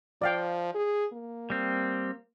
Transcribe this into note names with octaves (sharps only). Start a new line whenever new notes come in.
F3 D5 F5 G5
G#4
A#3
G3 C4